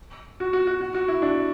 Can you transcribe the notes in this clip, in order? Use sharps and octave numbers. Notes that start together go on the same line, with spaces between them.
F#4
F#4
F#4
F#4
F#4
E4
D4